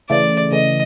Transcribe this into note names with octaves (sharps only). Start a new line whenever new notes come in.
C#3 E3 A3 D5
C#3 E3 A3 D#5